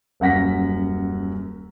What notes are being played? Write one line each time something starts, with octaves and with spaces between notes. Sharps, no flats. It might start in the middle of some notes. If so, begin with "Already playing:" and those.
D#1 F#2 F#5 A#6 B6